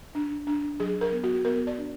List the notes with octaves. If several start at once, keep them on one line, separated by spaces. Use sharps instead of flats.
D4
D4
F#3 G#4
A#4
B3
F#4
B3 A#4
D5
D4